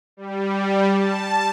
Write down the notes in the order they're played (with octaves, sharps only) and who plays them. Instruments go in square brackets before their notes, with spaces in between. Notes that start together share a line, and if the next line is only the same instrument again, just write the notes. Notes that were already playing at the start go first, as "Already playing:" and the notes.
[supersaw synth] G3
A5